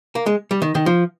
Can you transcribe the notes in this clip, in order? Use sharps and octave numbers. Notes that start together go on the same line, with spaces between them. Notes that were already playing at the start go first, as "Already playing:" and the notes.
A#3
G#3
G3
D#3
D#3
F3